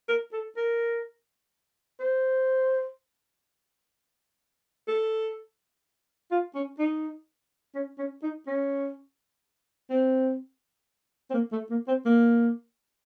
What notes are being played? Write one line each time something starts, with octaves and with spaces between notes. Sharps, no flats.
A#4
A4
A#4
C5
A4
F4
C#4
D#4
C#4
C#4
D#4
C#4
C4
C4
A#3
A3
A#3
C4
A#3